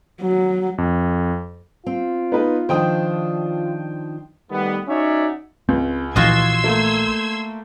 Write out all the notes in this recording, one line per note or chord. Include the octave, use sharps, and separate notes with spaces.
F#3
F2
C4 F4
B3 D#4 B4
D#3 F3 D4 C5 G5 D#6
D#3 G3 A3 B3
C#4 D#4 F#4 C#5 D5 E5
C#2 C4
A#1 E3 F4 F#4 D#5 C6 E6 G#6
A3 A#3